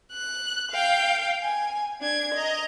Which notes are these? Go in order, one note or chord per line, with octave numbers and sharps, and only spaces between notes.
F#6
F5 G5
G#5
D4 G#6
D#5 A#5